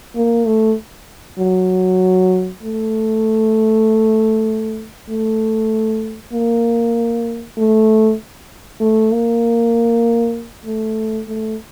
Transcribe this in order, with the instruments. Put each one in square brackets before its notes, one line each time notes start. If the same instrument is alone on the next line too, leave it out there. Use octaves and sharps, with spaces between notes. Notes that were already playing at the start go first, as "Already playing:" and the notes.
[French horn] A#3
A3
F#3
A3
A3
A#3
A3
A3
A#3
A3
A3